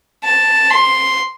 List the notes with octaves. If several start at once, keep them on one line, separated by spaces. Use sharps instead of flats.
A5
C6